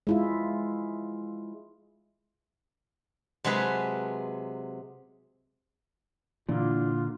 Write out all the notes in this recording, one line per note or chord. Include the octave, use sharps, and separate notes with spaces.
G#3 E4 F4
C3 F#3 G#3 G#4 B4 A5
A#2 D3 E3 D4 F4